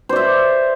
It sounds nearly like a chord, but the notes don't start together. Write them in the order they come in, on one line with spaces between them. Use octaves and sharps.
C5 D5 E5